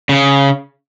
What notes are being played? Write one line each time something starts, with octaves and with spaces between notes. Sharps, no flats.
C#3